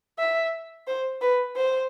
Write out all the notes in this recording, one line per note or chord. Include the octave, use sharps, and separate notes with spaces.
E5
C5
B4
C5